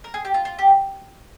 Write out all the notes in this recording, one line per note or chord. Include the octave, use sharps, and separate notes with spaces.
A#4
G#4
G4
F4
F4
G4